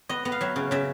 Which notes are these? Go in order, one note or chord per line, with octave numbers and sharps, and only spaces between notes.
B3 D#5
B3
F5
F#3 E5
C#3
C#3 E5